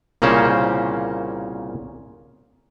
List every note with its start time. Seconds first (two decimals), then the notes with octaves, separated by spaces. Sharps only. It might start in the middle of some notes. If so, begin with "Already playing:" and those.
0.22 C2 A#2 C#3 A#3 C#4 C5